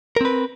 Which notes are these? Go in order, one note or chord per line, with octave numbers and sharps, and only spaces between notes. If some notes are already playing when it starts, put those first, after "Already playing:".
C4 A#4 B4